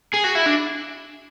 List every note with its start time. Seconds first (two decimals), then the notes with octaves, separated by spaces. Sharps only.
0.14 G#4
0.24 F#4
0.36 E4
0.46 D4